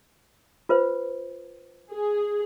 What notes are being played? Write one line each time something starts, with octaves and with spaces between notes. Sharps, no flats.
F4 B4 C5
G#4